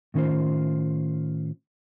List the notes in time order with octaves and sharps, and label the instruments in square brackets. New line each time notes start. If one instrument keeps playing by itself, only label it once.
[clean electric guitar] A2 D#3 C#4 F4 C5